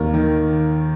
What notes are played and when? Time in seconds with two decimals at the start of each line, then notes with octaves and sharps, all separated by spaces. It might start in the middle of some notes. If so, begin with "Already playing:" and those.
Already playing: D#2 D#3 A#4
0.14 D#3